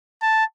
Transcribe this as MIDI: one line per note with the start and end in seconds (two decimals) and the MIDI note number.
0.22 0.45 81